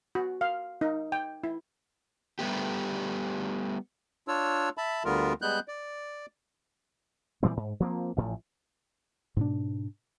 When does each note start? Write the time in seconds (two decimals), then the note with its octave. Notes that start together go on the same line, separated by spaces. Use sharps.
0.15 F#4
0.41 F5
0.81 D#4
1.12 G5
1.44 E4
2.39 G3 A3 B3 G4
4.28 D4 F4 C#5 E6
4.77 E5 A5 B5
5.05 D2 D3 G3 B3 F4 A#4
5.42 G3 G#3 B3 F#6 G6
5.68 D5
7.43 A#2 E3 G3 C4
7.57 G#2
7.80 F3 A#3 C4
8.17 A1 A2 F3
9.37 G#2 B2 D4